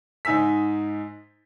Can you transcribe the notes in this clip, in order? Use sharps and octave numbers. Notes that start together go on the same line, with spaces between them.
G#2 D#4 G#5 E6 B6